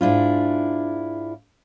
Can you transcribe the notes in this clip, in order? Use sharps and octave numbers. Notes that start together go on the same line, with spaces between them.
G#2 D4 E4 F4